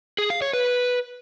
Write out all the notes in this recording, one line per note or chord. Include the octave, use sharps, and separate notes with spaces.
G#4
F5
C#5
B4